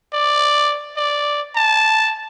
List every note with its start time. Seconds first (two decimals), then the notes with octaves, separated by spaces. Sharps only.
0.13 D5
0.97 D5
1.55 A5